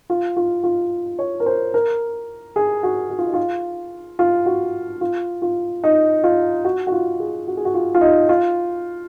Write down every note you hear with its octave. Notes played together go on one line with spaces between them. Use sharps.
F4
F4
F4
C#5
A#4
C5
A#4
G#4
F#4
F#4
F4
D#4
F4
F4
F#4
F4
F4
D#4
F4
F#4
F#4
F4
G#4
F#4
G#4
F#4
F4
F4
D#4
F4